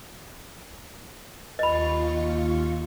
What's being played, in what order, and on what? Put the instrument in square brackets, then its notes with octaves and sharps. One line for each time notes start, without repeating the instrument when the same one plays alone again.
[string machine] D#2 F4 C#6 [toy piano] D#5 B5